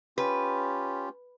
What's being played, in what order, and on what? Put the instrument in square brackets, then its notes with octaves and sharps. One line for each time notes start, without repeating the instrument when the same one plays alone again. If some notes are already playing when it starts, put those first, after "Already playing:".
[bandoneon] C#4 F4 G4 [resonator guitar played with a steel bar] B4